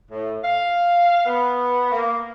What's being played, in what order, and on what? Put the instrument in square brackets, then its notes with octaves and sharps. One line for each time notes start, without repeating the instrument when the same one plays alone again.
[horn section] A2
F5
B3
A#3